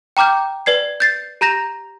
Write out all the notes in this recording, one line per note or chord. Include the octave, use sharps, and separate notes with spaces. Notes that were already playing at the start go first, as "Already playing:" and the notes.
G5 A#5 D6 F6 G6
B4 D5 G#6 C7
G6 A6 C7
G4 A#5 G6 A#6 F7